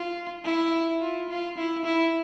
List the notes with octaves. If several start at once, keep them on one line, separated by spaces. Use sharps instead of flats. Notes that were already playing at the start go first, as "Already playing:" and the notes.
Already playing: F4
E4
F4
F4
E4
E4